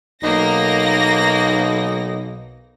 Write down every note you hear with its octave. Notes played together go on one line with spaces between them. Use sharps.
B1 A#3 D#4 A#6